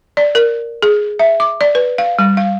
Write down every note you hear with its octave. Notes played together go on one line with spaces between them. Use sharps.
D5
A#4
G#4
E5
D6
D5
B4
F5
G3
F5